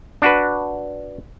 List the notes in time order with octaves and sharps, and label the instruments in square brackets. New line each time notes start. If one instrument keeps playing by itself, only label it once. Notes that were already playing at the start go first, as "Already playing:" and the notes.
[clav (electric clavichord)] D4 F#4 B4